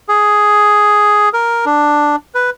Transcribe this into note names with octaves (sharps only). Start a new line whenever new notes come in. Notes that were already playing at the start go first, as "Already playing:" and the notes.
G#4
A#4
D4
B4